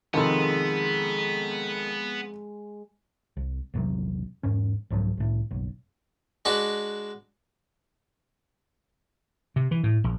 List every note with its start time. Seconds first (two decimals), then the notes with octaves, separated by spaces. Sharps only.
0.14 F2 C3 D#3 G#3 B3 A4 B5 C6
3.37 C2
3.74 A#1 E2 C3 F#3
4.43 E2 G#2 C#4
4.90 C2 G#2 F3 F#3
5.17 C2 A2
5.51 F#1 B1
6.45 G#3 D4 F#4 B4
9.56 C3
9.71 E3
9.83 A2
10.04 A#1